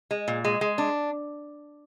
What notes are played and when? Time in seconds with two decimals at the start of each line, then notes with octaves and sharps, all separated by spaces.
0.11 G#3
0.28 A#2
0.45 G#3
0.61 G#3
0.78 D4